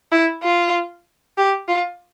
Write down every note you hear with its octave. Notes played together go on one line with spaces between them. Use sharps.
E4
F4
G4
F4